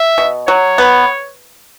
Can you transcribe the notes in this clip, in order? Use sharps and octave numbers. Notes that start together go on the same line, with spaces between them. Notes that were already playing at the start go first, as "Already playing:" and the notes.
Already playing: E5
B2
F#3 C#5
B3